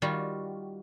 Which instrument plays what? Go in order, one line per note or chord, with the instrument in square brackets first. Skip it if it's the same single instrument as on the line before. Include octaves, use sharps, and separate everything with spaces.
[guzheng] D#3 G3 F4 F#4